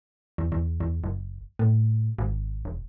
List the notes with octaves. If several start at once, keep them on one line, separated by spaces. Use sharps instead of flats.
E2
E2
E2
F#1
A2
G#1
E1